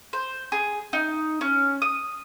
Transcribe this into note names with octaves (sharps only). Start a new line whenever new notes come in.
C5
G#4
D#4
C#4
D#6